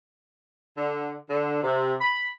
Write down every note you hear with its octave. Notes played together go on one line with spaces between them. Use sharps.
D3
D3
C3
B5